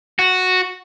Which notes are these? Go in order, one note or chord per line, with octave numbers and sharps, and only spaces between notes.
F#4